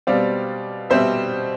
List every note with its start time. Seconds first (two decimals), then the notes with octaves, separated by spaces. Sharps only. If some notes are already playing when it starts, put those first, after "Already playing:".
0.07 B2 G3 C4 D5 F5
0.90 B2 G3 C4 C5 E5